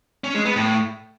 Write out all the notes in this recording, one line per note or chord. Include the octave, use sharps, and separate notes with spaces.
C#4
G#3
B3
A2